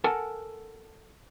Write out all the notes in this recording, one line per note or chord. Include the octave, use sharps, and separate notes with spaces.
A4 A#4 F#5 G#5 A5